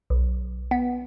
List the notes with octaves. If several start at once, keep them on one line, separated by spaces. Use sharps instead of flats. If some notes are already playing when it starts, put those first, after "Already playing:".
B1
B3